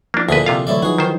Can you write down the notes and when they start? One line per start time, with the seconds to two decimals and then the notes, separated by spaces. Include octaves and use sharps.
0.14 F3 A#3 D4 E4
0.29 D2 A#2 D3 G#4 B4
0.46 C3 F4 F5
0.67 D2 E3 F#3 E4 C#5 D5
0.82 F3 D#4 F#4 G#4 B4
0.98 D#3 E3 A#4 C5